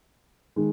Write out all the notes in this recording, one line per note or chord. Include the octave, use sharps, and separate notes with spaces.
D#3 G#3